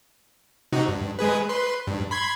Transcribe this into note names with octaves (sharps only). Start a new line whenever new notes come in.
C3 D#4 F#4
G2
G#3 G#4 B4
B4 C6
G2
B5 C6 G#6